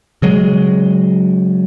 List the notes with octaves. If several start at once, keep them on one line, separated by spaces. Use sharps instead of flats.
C#3 F#3 G#3